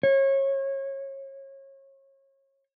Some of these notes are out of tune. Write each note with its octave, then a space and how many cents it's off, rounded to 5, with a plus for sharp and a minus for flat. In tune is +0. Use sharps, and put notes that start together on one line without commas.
C#5 -30